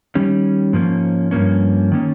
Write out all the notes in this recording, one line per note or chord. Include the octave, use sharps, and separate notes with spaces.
D#3 G3 C#4
G#2 F3 A#3 C#4
G2 F3 A#3 C#4
D#3 A#3 C#4